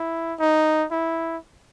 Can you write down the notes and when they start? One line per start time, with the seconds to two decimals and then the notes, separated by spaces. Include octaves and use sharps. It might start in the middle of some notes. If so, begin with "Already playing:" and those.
Already playing: E4
0.39 D#4
0.91 E4